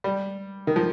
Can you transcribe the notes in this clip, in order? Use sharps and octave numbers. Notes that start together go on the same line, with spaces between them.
G3
D#3
F3